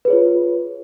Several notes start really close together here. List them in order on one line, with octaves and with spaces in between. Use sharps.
B4 G#4 C#5 F4